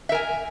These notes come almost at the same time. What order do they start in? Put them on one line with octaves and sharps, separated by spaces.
E5 A#4 G#5